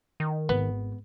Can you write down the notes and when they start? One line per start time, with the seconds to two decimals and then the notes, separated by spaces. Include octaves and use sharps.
0.20 D#3
0.49 G#1 B3